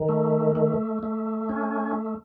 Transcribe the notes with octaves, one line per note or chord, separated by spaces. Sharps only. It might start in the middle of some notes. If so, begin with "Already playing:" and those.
Already playing: D#3
A3
A3
A3
C#4